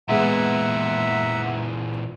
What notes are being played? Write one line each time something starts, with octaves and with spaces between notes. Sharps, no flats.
A#2 E3 G#3 B3 E5 F#5 A#5